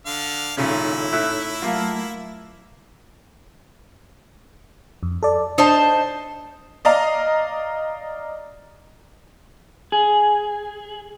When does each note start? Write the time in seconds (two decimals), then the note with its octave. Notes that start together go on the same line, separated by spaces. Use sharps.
0.06 D3 F5
0.57 G#1 A#2 C#3 D#4 E4 A4 C#5
1.12 A2 E5 F#6
1.62 F#3 A3 A#3 F4
5.03 F2
5.23 A4 D5
5.58 D4 D#4 C5 A5
6.85 D5 D#5 F5 A#5
9.92 G#4